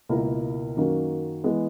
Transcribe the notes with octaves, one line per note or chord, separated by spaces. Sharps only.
C#2 B2 A#3 E4 A#4
F#2 D#3 A#3 C#4 F#4
E3 G#3 B3